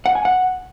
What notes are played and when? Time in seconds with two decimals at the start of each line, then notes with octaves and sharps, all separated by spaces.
0.06 F#5
0.15 G#5
0.25 F#5